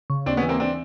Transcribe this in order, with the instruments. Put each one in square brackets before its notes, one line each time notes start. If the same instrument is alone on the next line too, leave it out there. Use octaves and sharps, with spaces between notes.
[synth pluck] C#3
[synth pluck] D#2 [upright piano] C4 D4
[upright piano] B3 C#4
[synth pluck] E3
[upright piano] A#3 C4
C4 D4